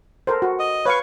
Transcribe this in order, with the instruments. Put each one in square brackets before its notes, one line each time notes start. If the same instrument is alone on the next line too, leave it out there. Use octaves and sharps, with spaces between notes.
[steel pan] A4 A#4 C5
F#4
[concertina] D#5
[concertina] B4 [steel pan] C#5 F5 C#6